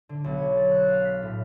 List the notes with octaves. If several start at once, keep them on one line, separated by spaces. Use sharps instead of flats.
D3
B1
C#5
A6
F#6
F5
B6
A2